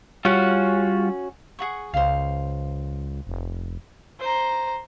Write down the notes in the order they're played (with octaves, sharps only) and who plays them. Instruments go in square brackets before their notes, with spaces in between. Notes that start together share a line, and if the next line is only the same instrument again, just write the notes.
[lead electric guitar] G3 [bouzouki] C#4 F#4 [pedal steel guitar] F4 F#5
[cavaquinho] G#4 F#5 C#6
[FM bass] C#2 [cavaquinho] C5 F5
[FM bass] F1
[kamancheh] C5 A#5